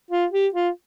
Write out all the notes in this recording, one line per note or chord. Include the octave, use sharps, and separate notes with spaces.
F4
G4
F4